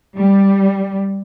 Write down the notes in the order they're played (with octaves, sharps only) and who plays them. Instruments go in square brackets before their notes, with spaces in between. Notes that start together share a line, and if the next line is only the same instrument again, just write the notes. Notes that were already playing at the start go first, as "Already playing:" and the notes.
[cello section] G3